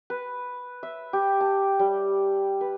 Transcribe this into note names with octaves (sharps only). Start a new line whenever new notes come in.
B4
E5
G4
A5
G3
B4